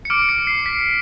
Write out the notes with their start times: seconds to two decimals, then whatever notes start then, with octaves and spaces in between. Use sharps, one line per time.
0.05 C#7
0.10 D6 F6 D7
0.29 C#7
0.47 C7
0.66 B6